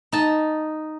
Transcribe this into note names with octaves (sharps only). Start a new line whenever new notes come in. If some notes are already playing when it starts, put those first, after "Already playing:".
D#4 A5